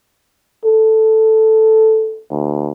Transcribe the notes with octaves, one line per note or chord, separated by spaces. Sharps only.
A4
D2